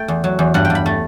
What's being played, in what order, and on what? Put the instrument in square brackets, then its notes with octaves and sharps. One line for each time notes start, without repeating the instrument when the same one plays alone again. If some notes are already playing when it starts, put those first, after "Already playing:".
Already playing: [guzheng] A3 G5
E2
F#3
E2
G2 F#5
G5
G2
B5
A3